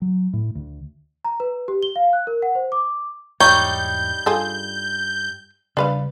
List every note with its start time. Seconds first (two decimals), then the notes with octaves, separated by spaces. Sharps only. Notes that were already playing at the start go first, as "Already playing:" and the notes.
0.02 F#3
0.33 A2
0.55 D2
1.25 A#5
1.40 B4
1.68 G4
1.83 G7
1.96 F5
2.13 F#6
2.27 A#4
2.42 F#5
2.55 C5
2.72 D6
3.40 E2 G#2 G3 D#4 C#5 G6
4.26 G2 F4 G#4 A4
5.77 C#3 G3 D4 B4 F5